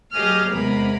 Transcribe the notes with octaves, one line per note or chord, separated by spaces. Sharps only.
F#3 G4 G#4 D#5 D#6 F6
E2 C3 G#3 B3 A#4 B5